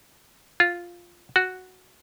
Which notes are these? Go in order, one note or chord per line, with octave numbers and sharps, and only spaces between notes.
F4
F#4